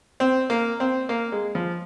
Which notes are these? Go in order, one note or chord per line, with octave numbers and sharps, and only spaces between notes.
C4
A#3
C4
A#3
G#3
F3